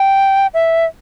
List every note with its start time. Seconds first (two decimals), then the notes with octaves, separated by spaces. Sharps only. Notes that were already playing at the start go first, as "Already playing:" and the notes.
Already playing: G5
0.54 E5